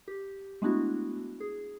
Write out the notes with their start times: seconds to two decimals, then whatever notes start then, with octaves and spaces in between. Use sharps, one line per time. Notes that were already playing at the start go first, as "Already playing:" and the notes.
0.08 G4
0.62 G#3 A3 B3 D4 E4 F#4
1.40 G#4